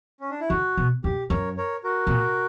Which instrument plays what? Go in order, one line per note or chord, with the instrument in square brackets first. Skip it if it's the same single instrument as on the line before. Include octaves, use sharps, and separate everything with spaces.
[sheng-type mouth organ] C#4
D4
E4
[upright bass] D3 [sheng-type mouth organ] F#4
[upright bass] B2
[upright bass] F#2 [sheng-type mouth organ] G4
[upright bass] F#2 [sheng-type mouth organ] A#4 C#5
[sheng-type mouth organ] A#4 C#5
F#4 A#4
[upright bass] B2
A#2